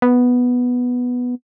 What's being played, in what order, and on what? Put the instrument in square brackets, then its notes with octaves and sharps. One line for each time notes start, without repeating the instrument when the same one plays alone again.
[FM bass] B3